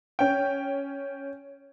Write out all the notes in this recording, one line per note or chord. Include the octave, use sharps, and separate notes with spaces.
C#4 G5